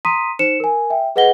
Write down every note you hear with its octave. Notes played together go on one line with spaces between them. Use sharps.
A#5 C6 D#6 B6 D#7
D#4 C5 C#7 E7
A#4 G#5
E5 G5
G#4 B4 D#5 F#5 A#6 G7